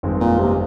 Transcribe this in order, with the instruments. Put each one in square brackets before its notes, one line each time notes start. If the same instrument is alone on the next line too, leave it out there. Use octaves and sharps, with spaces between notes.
[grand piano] G1 F2 D#3 G#3 C4
[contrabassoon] A#2
C3